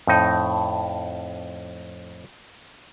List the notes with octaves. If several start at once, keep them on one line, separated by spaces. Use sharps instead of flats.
F2 A2 D#4